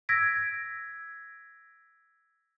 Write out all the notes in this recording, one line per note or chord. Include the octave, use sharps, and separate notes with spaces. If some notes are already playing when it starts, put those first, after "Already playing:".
E6 G#6 A#6 B6 D7